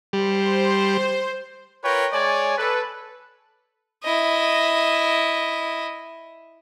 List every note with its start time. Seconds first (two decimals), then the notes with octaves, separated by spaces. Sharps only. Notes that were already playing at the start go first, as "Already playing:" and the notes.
0.13 G3 C5
1.84 F4 A#4 B4 C#5 G5
2.13 G#3 C#5 D5 G#5
2.58 A4 B4
4.04 E4 D#5